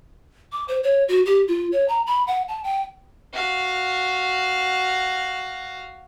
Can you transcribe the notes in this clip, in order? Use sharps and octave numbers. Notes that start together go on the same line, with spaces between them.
D6
C5
C#5
F#4
G4
F4
C#5
A#5
B5
F#5
A5
G5
F#4 F5